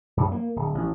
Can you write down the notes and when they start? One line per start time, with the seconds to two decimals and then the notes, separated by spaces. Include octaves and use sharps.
0.17 F#2
0.32 A#3
0.56 D1
0.75 A1